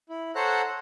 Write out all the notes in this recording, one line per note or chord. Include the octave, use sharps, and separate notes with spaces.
E4
A4 C5 C#5 F#5 A#5 F#6